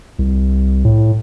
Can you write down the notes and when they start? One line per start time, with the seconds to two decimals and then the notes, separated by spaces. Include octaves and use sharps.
0.19 C2
0.85 A2